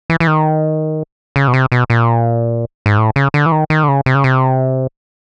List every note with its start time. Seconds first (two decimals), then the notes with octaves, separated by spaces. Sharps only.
0.10 E3
0.20 E3
0.27 D#3
1.36 C#3
1.48 B2
1.54 C3
1.72 B2
1.90 A#2
2.86 G#2
2.98 A2
3.16 C#3
3.34 D3
3.46 E3
3.52 D#3
3.70 D#3
3.84 D3
3.88 C#3
4.06 C3
4.15 C#3
4.24 C3